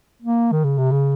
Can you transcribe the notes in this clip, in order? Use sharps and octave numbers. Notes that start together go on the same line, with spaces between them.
A#3
D#3
C#3
C3
C#3